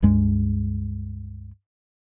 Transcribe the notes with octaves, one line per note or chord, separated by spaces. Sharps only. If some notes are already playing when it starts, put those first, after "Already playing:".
C#2 G2 G#3